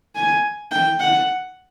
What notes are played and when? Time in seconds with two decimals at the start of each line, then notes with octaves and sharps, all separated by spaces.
0.15 G#5
0.71 G5
1.00 F#5